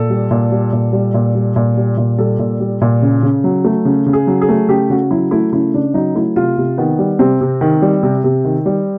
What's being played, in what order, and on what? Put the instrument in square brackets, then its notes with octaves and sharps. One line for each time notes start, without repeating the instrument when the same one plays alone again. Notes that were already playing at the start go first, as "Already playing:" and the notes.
Already playing: [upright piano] A#2 A4
G3
A#2
G3
A#2
G3
A#2
G3
A#2
G3
A#2
G3 A4
A#2
G3
A#2
C#3
C#3
F#3
A3
C#3
C#3
G#4
F#3
G#4
A3
C#3 G4
C#3 F#4
F#3 E4
A3 E4
C#3 E4
C#3 D4
F#3 D#4
A3 E4
C3 F4
C3
D#3 B3
G3
C3 C4
C3
D#3
G3
C3
C3
D#3
G3